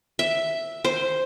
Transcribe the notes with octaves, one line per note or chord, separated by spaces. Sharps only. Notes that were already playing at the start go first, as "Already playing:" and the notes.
E5
C5